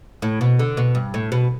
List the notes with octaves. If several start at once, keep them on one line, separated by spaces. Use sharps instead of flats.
A2
B2
D3
B2
G2
A2
B2